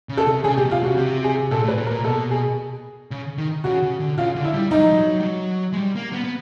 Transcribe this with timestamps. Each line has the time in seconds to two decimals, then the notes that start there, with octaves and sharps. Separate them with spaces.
0.09 C#3
0.17 A4
0.27 C3
0.44 C#3 G#4
0.57 C3 G4
0.65 B2
0.71 C3 F4
0.84 C#3 F#4
0.97 C3 G4
1.24 G#4
1.51 A#2 A4
1.64 A2
1.68 B4
1.78 A#2
1.86 A#4
1.91 A#2
2.04 B2 A4
2.31 G#4
3.11 C#3
3.38 D#3
3.64 C#3 F#4
3.82 C#3
4.00 D3
4.18 C#3 F4
4.36 D3
4.45 E4
4.53 G3
4.71 G3 D#4
4.79 F#3
4.86 F3
4.93 F#3
5.20 G3
5.24 F#3
5.73 G#3
5.78 G3
5.95 A#3
6.13 B3
6.24 B3